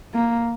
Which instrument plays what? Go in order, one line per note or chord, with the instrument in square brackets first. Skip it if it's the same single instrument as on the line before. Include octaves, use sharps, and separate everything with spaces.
[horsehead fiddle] A#3